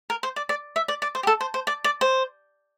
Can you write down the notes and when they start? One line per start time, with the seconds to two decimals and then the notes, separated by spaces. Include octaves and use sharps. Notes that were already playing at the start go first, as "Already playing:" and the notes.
0.10 A#4
0.23 C5
0.36 D5
0.49 D5
0.76 E5
0.88 D5
1.02 D5
1.15 C5
1.23 G4
1.27 A4
1.41 C5
1.54 C5
1.67 D5
1.84 D5
2.01 C5